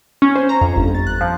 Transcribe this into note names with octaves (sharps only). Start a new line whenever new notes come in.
C#4
C5
A#5
F2
G1
A6
F#6
F3